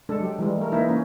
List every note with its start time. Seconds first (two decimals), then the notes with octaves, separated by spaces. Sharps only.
0.09 G#3 D4 A4
0.20 F#3 G4
0.39 E3 G3 G#3
0.57 A3 A#4
0.71 E3 A#3 D#4 E4 A#4
0.89 A#3 C#4